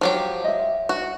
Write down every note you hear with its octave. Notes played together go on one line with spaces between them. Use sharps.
F3 F#3 G4
D#5 E5
F#4